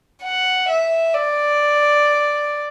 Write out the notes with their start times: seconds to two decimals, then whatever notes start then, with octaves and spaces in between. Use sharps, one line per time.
0.23 F#5
0.69 E5
1.14 D5